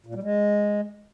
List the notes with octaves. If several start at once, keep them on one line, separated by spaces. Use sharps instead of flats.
A#2
G3
G#3